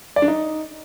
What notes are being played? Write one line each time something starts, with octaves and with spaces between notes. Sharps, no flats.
D5
D4
D#4